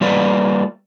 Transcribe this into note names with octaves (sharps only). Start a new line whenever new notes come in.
G3 A#3 F4 B4 D5